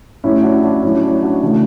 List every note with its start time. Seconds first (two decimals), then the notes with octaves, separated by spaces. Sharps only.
0.24 A2 G3 C#4 E4
0.43 D4 F#4
0.63 D4 F#4
0.83 A2 F#3 A3 C#4 E4
1.03 D4
1.23 D4 F#4
1.42 C#3 E3 A3 D4 F#4